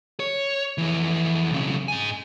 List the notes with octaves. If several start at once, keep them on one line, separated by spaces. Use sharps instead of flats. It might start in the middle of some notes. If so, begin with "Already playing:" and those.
C#5
F2 E3
B1 C#3
G#2 G#5